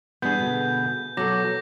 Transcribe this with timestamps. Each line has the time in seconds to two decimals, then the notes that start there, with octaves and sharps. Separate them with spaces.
0.22 E3 G3 B3 D4 G#4 G6
0.39 B2 D3
1.17 B2 F#3 A4 D6 A#6